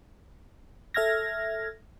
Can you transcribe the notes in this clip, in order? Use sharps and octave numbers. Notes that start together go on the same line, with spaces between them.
A4 E5 F6 G#6 A#6